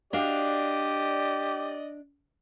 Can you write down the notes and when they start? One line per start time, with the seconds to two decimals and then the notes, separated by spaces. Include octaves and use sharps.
0.13 D4 F#4 G4 D5 D#5 F5